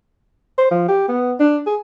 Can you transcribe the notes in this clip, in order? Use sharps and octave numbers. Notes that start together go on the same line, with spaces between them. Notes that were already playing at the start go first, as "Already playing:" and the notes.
C5
F3
G4
B3
D4
G#4